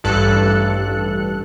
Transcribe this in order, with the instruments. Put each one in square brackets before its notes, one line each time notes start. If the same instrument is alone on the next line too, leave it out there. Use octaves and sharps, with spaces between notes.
[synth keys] A1 G2 A4 F#6 C#7